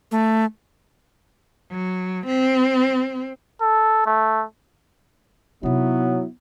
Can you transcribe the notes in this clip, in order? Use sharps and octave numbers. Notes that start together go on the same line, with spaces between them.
A3
F#3
C4
A4
A3
C3 F#3 B3 D#4 E4